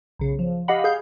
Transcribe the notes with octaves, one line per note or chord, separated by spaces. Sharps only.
B1 C#3
F3
G4 D#5 F5 F#5 B5
G#4 F5 G6